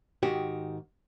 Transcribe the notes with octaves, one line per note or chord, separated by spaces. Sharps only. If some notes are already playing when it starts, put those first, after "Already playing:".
G#2 D#3 F#4 G4